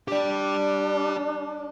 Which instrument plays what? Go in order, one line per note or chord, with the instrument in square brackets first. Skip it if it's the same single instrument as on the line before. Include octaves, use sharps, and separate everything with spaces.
[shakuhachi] D4 [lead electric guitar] G4 D5